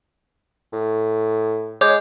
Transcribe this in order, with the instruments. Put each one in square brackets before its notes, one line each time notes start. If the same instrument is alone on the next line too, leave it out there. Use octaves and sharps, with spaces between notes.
[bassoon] A2
[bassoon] G#3 [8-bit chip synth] C#5 D6 G6